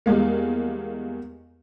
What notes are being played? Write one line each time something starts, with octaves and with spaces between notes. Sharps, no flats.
E2 G3 G#3 A#3